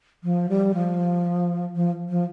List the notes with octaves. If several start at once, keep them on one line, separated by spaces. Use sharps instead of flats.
F3
G3
F3
F3
F3